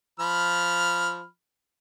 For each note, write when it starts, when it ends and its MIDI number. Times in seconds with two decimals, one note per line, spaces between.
0.20 1.26 53
0.20 1.26 83
0.20 1.26 89